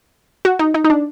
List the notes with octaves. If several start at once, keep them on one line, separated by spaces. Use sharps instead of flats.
F#4
D#4
D#4
D#4
D4